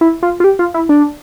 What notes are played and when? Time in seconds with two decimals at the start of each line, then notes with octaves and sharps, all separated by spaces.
0.01 E4
0.23 F4
0.40 F4
0.44 G4
0.59 F4
0.74 E4
0.89 D4